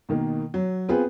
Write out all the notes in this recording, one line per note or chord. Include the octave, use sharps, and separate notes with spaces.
B2 D#3 A#3
F#3
B3 C4 F4 G#4 B4